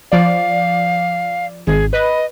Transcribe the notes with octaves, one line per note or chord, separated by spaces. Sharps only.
F3 D5 F5
G#1 G#4
B4 D#5